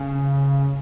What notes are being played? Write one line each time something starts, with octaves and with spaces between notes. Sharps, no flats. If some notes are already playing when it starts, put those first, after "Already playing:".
Already playing: C#3